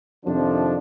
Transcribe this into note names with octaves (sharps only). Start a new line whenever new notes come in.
F2 C3 D#3 F3 D4